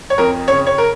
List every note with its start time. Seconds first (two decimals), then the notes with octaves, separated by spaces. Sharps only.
0.10 C#5
0.18 F2 A#4
0.48 C#3 C#5
0.67 C#5
0.78 A#4